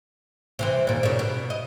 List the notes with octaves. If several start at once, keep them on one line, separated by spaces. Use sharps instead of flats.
C3 E3 C4
D#2 A#2
A#2 C#3
B2
D#5